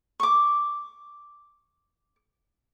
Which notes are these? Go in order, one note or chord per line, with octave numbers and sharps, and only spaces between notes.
C#6 D6